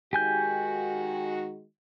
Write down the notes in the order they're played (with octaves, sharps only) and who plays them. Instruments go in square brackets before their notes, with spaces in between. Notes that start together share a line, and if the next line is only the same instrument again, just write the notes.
[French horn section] D#3 G#3 F#4 [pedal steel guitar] G4 G#5 G6